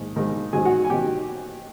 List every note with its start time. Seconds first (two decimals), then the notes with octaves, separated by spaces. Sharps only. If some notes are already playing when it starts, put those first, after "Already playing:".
Already playing: A#1 G#2 D#3 G#3
0.16 A#1 G#2 D#3 G#3
0.53 A1 G#2 D#3 F#3 G#4 G#5
0.65 F#4 F#5
0.85 G#5
0.90 A1 D#3 F#3 G4 G5